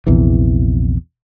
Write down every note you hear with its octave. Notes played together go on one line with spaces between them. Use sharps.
A#1 E2 C3 E3